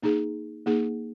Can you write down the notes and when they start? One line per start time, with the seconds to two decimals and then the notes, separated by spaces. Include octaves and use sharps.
0.03 A#3 D#4 G#4
0.66 A#3 D#4 G#4